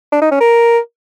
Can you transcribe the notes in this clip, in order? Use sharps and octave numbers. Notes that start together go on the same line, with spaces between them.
D4
D#4
C#4
A#4